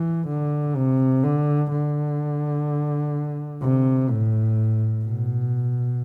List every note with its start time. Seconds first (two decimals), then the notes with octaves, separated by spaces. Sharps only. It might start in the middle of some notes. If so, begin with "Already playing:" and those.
Already playing: E3
0.28 D3
0.76 C3
1.23 D3
1.72 D3
3.62 C3
4.10 A2
5.05 B2